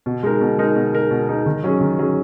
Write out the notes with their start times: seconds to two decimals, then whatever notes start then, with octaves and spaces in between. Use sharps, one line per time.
0.06 B2
0.23 G#3 D#4 A#4
0.41 B2
0.58 G#3 D#4 A#4
0.76 B2
0.93 G#3 D#4 A#4
1.11 B2
1.29 G#3 D#4 A#4
1.46 D#3
1.64 F#3 C#4 G#4
1.81 D#3
1.99 F#3 C#4 G#4